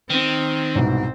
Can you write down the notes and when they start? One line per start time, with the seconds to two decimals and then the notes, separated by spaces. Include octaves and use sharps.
0.10 D#3 C4
0.75 C2 G#2 B2